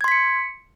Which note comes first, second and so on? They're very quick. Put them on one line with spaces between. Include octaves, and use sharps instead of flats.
G#6 C6 B6 C#7